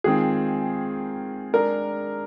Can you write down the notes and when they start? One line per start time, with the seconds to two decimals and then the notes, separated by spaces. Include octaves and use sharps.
0.04 D#3 G#3 C4 F4 G#4
1.53 G#3 D4 G#4 A#4 D5